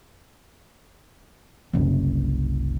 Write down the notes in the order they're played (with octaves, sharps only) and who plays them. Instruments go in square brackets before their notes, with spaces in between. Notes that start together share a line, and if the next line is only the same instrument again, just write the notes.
[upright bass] F#1 C2